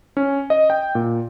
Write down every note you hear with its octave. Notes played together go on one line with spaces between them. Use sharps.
C#4
D#5
G5
A#2